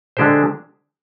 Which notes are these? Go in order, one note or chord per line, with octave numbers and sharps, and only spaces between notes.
D3 G#3 D4 G4 C5